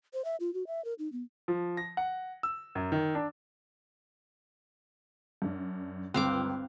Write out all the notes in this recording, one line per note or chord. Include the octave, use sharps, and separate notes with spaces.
C5
E5
F4
F#4
E5
A#4
D#4
B3
F3
A#6
F#5
E6
F#2
D#3
D4
F#2 D4
G1 C#2 C4 F5 D6 F#6